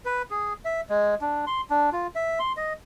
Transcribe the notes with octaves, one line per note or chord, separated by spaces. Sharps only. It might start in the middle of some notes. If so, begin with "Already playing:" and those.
B4
G#4
E5
G#3
D4
C6
D4
F4
E5
C6
D#5